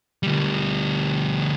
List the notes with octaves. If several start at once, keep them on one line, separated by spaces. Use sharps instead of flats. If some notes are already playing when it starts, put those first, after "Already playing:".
D2 G3